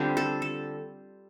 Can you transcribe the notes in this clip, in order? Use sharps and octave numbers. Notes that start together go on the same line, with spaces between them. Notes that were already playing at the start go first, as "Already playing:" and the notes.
Already playing: D3 G3 C4 D4 F4 G4
A4
A4